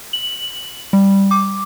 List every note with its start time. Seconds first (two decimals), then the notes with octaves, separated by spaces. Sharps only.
0.13 F#7
0.93 G3
1.31 D6